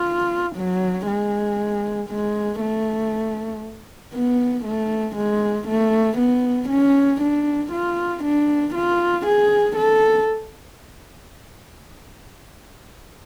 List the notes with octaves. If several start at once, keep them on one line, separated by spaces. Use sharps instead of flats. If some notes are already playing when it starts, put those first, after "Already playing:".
Already playing: F4
F#3
G#3
G#3
A3
B3
A3
G#3
A3
B3
C#4
D4
F4
D4
F4
G#4
A4